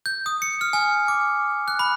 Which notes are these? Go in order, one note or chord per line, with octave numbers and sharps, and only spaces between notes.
G6
D#6
C#7
F6
G#5
D6
F#6
B5